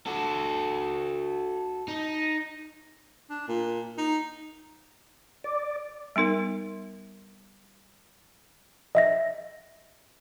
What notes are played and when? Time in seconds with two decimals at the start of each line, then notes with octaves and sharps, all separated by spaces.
0.06 F#4 A4
1.88 D#4
3.30 D4
3.48 A#2
3.98 D#4
5.44 D5
6.16 G3 B3 D#4 A#4
8.95 D#5 E5 A#6